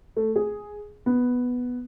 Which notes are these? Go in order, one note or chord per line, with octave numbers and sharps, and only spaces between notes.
A3
G#4
B3